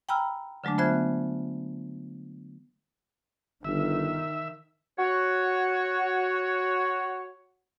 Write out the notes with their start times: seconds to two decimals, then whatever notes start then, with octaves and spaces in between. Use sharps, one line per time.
0.09 G5 G#5 A#5 B5 E6 F6
0.64 D3 F#3 G#3 A3 D4
0.78 B3 F4 C5 E5 F#6 G#6
3.64 G1 D#3 E5
4.99 F#4 C#5